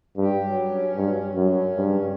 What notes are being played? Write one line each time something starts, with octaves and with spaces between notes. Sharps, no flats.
G2 G4
F#3
C#4
G2 F#3
F#3
F#2
C#4
G2 C#3